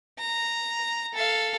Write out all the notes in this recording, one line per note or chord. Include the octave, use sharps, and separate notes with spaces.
A#5
A4 F5